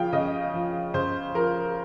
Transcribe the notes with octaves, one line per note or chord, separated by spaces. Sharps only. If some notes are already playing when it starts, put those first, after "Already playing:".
Already playing: C#3 F3 F5 G5
C#3 D#5
F3
C#3 C5
F3 A#4